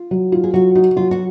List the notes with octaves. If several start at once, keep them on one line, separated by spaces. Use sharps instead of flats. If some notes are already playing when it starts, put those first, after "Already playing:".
Already playing: F4
F#3
F4
G#4
F#3 F#4
D#4 F#4
F#3 F4
F#4